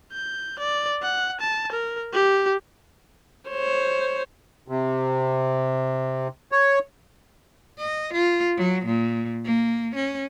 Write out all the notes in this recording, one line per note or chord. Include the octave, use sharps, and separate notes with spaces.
G6
D5
F#5
A5
A#4
G4
C5 C#5
C3
C#5
D#5
F4
F#3
A#2
A#3
C#4